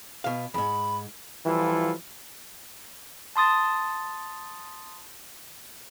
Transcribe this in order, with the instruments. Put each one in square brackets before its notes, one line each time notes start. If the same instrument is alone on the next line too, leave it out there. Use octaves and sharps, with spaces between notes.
[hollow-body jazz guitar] B2 F5
[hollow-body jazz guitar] E2 G#2 [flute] B5
[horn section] E3 F3 G3 E4 F4 A4
[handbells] A5 C6 D#6 A6